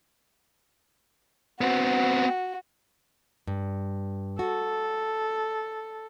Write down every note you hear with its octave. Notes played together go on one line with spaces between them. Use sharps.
B3 C4 F#4
G2
F#4 A4